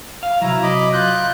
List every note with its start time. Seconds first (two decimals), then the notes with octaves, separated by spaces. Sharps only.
0.23 F5
0.41 C3 F#3 E4 A#5
0.63 D#5 B5 D6
0.93 F4 F#6 G6